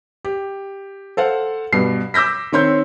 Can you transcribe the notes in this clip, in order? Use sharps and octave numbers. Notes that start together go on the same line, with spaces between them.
G4
A4 C5 F5 F#5
G2 B2 C7
D6 E6 G6 A#6 B6
D#3 C4 C#5 C6 G6